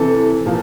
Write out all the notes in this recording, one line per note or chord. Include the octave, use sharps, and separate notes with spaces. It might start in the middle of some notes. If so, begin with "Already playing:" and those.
Already playing: C3 E3 A4
A#2 F3